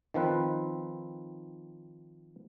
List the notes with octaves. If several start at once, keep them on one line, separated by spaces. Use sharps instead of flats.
D#3 F3 C4 B4